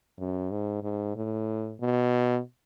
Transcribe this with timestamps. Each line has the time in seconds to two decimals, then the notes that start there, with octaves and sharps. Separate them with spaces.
0.19 F#2
0.51 G#2
0.83 G#2
1.16 A2
1.81 B2